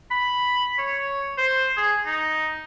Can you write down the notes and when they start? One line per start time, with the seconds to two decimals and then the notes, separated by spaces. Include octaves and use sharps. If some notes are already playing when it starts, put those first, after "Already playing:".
0.11 B5
0.78 C#5
1.38 C5
1.77 G#4
2.06 D#4